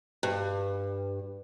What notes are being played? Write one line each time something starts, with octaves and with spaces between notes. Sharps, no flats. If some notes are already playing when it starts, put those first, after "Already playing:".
G2